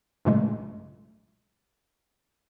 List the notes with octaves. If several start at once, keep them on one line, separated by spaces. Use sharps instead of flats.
B1 G2 A#2 C#3 G#3 A3